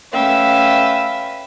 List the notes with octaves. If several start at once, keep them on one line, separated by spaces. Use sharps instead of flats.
A3 C#4 B4 E5 F5 G5